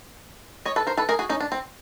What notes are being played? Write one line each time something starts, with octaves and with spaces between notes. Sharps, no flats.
C#5 D#5
A4 B4
A#4 C5
A4 B4
G#4 A#4
F#4 G#4
C#4 D#4
D4
C4